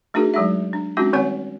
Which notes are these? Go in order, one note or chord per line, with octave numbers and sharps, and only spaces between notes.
A3 D4 D#4 F#4 G#4 A#4
F#3 G#3 D#4 E5
D4
G#3 C4 C#4 D#4 F4 F#4
D#3 G3 B3 C4 C#5 G#5